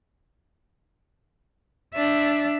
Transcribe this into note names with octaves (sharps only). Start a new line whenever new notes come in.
D4 E5